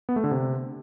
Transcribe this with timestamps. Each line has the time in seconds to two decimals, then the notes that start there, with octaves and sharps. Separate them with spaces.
0.09 B3
0.16 A3
0.24 D3
0.31 C3